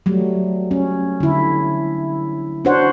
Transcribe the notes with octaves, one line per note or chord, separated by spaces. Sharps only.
F#3 G3 A3
C#4
D3 E4
D4 E4 F#4 C5 C#5 F#5